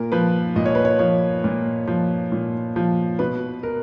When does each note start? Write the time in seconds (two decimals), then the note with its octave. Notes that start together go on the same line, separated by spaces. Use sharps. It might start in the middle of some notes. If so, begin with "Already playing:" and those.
Already playing: A#2 A#4
0.12 F3 B4
0.56 A#2 D#5
0.66 C#5
0.75 B4
0.85 C#5
0.99 F3 C#5
1.44 A#2
1.87 F3
2.32 A#2
2.76 F3
3.19 B2 B4
3.63 A#4